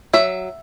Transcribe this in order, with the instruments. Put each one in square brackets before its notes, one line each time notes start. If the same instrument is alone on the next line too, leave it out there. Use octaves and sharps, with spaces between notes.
[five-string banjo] F#3 E5